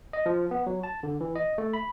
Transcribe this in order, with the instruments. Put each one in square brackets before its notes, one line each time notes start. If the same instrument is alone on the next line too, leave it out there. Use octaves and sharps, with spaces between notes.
[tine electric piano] D#5
F3
B3
F#3
A5
D3
E3
D#5
A3
B5